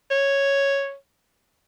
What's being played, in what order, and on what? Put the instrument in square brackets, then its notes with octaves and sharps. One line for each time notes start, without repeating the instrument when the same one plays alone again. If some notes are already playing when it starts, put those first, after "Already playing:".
[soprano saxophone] C#5